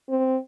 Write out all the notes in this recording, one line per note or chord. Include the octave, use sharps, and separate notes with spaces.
C4